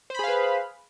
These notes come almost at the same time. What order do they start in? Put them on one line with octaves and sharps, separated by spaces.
C5 B5 G#4 F5 B4